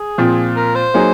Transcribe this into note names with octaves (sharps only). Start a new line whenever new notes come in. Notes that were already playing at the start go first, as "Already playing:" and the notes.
Already playing: G#4
A#2 F3 C4
A#4
C5
F#3 A#3 D#4 G#4